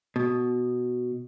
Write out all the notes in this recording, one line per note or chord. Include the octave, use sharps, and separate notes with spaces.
B2